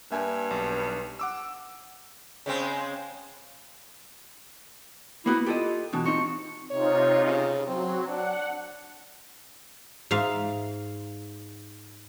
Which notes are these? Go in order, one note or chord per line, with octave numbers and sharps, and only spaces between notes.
G2 A#3 E5 G#5
B1
F#5 D6 E6
C#3 G#3 C4
A#3 B3 E4 F#4
F4 G4 A4 D#5
B2 E3 D4
C4 D#4 F4 C#6
C3 D#4 F4 C#5
C#3
F#3 C4
D4 F#5
G#2 E5 F5